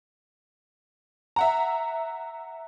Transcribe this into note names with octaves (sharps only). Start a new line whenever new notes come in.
E5 F#5 A#5